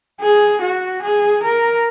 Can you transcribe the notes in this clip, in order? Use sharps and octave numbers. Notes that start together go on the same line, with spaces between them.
G#4
F#4
G#4
A#4